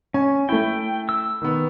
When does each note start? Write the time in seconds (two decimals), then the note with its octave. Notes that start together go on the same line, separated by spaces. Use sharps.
0.14 C#4 G#5
0.49 A3 E4 G5
1.09 E6
1.42 D#3 B3